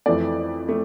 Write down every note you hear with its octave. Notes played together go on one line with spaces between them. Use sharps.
F2 E3 A3 D5
A3